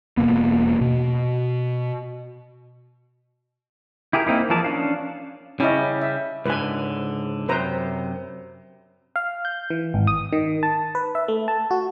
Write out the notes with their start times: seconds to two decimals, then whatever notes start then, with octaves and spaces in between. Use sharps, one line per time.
0.17 E1 B2 A#3 B3
0.81 B2
4.13 E4 G4 G#4 A#4
4.26 A#3 C4 D#4 E4
4.50 E3 F3 G#4 A#4 A5
4.64 C#4 D4 F5
5.60 C#3 G3 C#4 E4 D#5
6.02 E5
6.46 C#2 G#2 D3 B4 G#5
7.49 F#2 C3 B4 C5 A#5
9.16 F5
9.45 G6
9.70 E3
9.94 G#1
10.07 D#6
10.33 D#3
10.63 A5
10.95 B4
11.15 E5
11.28 A3
11.48 A5
11.71 F#4